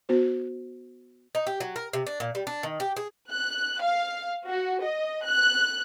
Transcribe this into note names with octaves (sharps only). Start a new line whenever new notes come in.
B3 F#4 C5
D#4
G4
F#3
A#4
C3
D4
A#2
G3
D4
D#3
G4
G#4
F#6
F5
F#4
D#5
F#6